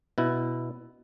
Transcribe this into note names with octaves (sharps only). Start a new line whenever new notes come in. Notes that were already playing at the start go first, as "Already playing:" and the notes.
B2 E4